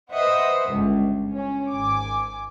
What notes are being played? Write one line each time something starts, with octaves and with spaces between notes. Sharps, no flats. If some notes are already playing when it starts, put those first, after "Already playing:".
B4 C5 D#5 E5 F#5
G1 C#2
C#4
G#1 G#5 D6